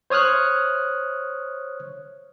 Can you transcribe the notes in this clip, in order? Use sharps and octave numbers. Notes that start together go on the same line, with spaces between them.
C5 C#5 D#6 F6 F#6